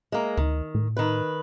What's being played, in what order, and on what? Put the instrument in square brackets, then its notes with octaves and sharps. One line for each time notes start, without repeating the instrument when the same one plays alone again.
[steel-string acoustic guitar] G#3 A#3
[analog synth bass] D2 [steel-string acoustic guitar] D#3
[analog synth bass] A2
[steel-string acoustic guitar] D#3 B4